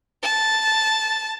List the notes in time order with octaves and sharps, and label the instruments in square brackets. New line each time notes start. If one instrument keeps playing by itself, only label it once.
[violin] A5